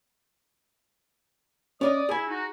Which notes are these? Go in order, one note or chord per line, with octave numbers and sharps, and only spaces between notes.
C#4 D4 D5 D#5 D#6
E4 G#4 G#5
D#4 F#4